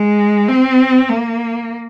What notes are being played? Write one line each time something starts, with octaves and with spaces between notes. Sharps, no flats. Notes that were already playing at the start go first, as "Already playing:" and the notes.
Already playing: G#3
C4
A#3